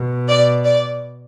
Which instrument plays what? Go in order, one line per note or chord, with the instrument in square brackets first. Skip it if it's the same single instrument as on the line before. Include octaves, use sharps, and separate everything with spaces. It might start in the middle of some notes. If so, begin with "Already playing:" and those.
Already playing: [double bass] B2
[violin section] D5
D5